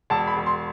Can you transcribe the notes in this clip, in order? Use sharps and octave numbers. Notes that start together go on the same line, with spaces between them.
E1 A5
B5
E1
C6